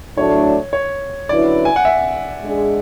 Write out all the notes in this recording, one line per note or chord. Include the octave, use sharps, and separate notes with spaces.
A2 F#3 A3 D4 C#5
C#5
D3 F#3 C#4 E4 B4 D5
G#5
F#5
E5
G#3 D4 G#4